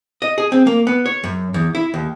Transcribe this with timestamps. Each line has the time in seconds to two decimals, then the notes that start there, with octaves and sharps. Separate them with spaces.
0.22 D#5
0.38 G#4
0.52 C4
0.67 A#3
0.87 B3
1.06 C#5
1.24 F#2
1.54 E2
1.75 E4
1.94 D#2